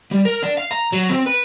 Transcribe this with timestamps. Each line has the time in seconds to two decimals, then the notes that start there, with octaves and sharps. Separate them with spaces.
0.11 G3
0.25 A#4
0.42 D4
0.57 F5
0.71 A#5
0.92 F#3
1.09 C4
1.26 B4